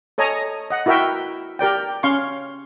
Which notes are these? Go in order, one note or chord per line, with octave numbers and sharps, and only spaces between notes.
A4 C#5 D#5 G#5 A#5
D#5 F#5
E4 F#4 A#4 E5 G5
G4 A#4 D5 G5
C#4 F5 C6 C#6